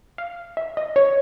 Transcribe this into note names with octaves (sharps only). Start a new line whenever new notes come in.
F5
E5
D#5
C#5